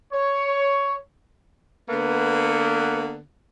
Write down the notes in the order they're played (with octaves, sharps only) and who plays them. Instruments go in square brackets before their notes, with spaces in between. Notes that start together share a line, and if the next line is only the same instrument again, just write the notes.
[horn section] C#5
[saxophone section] D3 A#3 B3